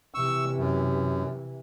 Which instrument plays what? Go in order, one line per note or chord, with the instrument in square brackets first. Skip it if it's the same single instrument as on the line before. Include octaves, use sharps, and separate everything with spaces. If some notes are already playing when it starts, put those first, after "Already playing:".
[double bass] C3 E3 [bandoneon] C#6 E6
[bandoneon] F#2